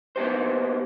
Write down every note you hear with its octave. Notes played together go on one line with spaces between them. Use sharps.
A#3 B3 G4 C5